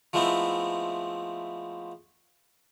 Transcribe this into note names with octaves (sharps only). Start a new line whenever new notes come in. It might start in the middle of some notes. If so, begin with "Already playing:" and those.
F3 G#3 A3 B3 C4 E4